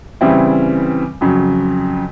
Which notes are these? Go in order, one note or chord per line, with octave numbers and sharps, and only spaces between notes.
C#3 E3 G3 C4 E4
F2 C#3 F#3